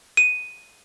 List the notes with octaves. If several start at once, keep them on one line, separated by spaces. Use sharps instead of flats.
D#7